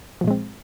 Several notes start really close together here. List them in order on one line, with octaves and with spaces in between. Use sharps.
F3 A#2 G#3 C4